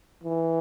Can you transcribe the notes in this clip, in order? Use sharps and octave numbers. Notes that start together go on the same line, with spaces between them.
E3